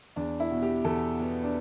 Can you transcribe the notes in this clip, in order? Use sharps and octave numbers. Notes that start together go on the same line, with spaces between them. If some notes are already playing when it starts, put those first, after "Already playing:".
E2 D4
E4
B2
G4
E2 A4
B2 B3
D4